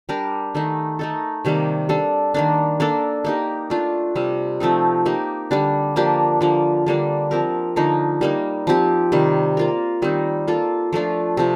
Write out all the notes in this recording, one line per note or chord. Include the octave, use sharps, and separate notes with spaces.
G3 D4 G4 A#4
D#3 A3 D#4
A3 D#4 A4
C3 D#3 G3 A#3
G3 D4 A4
D#3 A#3 D4
A#3 D4 A4
A#3 D#4 G4
A3 D4 F4
C3 G3 C4
F3 A3 C4 D#4
A#3 D#4 G4
D3 G3 D4
F3 A#3 D4 G4
D3 F3 A#3
D3 G3 A#3 D4
F3 C4 G4 A#4
D3 F3 A#3 D#4
G3 A#3 D#4
F3 C4 G4
C3 D#3 G3
A#3 F4 A#4
D#3 G3 C4 D#4
A#3 F4 A4
F3 A3 D4 F4
C3 F3 C4